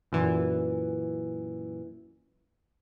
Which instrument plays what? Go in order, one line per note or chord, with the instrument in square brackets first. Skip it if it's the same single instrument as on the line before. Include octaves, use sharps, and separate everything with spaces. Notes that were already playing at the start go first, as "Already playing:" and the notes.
[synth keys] F#2 A#2 E3